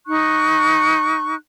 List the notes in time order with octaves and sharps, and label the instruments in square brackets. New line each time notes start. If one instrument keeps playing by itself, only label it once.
[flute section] D#4 C#6 F#6